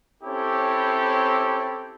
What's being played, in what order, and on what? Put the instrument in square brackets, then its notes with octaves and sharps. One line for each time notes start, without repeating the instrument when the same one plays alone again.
[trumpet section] C4 C#4 E4 G4 A4 C#5